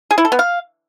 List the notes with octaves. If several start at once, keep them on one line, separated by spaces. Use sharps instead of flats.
G#4
E4
A4
B3
F5